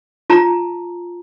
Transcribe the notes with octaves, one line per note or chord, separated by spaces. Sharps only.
F4 A5 A#5